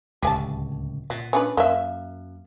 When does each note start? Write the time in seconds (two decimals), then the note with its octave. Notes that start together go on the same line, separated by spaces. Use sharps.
0.22 D1 C#2 G4 G#5 A5
1.10 A#2 F#5
1.33 C#4 D4 B4
1.57 F#2 A#3 E5